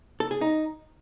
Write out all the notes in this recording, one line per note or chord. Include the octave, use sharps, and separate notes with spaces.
A4
G#4
D#4